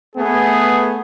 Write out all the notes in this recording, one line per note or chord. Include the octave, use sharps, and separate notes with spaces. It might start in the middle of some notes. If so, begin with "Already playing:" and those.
A3 B3 G#4